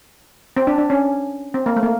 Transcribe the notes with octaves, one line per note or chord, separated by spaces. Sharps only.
C4
D4
D4
C#4
C4
A#3
A3
A#3